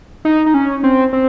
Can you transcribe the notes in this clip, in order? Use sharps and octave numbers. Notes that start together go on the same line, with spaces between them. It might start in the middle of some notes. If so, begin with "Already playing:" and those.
D#4
D#4
C#4
C4
C4